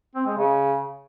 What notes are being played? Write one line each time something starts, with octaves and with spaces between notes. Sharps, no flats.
C4
G#3
C#3